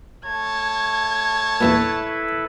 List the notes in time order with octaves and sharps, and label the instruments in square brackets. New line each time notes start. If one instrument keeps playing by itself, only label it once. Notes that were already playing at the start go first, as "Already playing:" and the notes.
[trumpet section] A3 C#5 A5 [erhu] G#6
[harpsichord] E2 G2 A#2 [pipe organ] E4 A4 B4